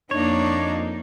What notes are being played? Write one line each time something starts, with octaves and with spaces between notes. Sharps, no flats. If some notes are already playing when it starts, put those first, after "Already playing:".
F2 A#3 D4 D#4 C#5